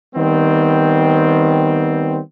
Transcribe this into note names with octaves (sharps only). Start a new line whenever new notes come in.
D#3 G3 B3 C4